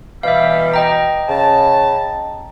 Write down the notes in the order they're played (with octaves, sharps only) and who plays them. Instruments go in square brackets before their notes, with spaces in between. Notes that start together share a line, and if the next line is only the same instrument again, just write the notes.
[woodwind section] B2 E3 G3 [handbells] E5 F5
[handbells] D#5 G5 A#5
[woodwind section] C#3 A5